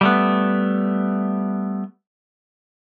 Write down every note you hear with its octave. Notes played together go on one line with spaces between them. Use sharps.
G3 A3 B3